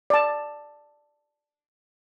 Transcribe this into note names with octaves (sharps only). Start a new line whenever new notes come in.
D5 A5